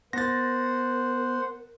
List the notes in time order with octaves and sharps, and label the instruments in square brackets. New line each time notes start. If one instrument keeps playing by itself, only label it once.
[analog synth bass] B3 [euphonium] A#4 [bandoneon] C5 F#5 [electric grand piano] A6 A#6